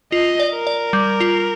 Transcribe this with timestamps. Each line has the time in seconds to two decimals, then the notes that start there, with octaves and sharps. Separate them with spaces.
0.12 F4 D#5
0.40 D5
0.52 A#4
0.67 D5
0.93 G3
1.20 F4